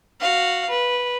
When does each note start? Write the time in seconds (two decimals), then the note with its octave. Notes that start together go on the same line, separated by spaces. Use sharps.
0.20 F#4 F5
0.69 B4